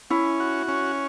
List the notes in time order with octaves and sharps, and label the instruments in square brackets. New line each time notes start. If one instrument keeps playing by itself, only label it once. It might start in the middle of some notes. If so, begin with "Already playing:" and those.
[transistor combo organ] C#4 [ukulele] E4
[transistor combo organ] F#4
C#4